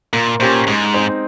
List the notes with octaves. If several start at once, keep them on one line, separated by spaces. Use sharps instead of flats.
A#2 A#3
A#2 C#4 G4 C5
G#2 G#3
C4 D#4